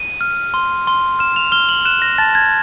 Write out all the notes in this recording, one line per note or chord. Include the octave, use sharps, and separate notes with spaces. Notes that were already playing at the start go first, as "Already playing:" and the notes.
Already playing: D#7
F6
C6
C6
F6 E7
F7
F6 G7
F#7
F#6 E7
A#6
A5 A6
G#6